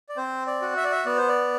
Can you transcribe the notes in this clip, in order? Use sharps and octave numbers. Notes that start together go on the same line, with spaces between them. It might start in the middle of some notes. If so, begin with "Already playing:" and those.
D5
C4 C5
D5
F#4
E5
D5
E5
B3 D5
C5
D5